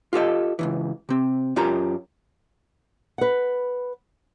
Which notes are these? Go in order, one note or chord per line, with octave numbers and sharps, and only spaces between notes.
F4 G4 A4 D#5
C#2 G#2 E3
C3 C4
F#2 C#4 F4 G4 A#4 A#5
B4 F#5